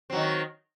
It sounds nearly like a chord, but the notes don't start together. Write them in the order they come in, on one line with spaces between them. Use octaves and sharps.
C4 F#3 D#3